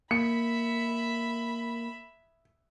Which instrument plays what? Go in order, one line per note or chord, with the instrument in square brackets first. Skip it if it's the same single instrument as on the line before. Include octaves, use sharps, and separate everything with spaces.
[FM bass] A#3 [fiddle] E5 B5 [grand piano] C#7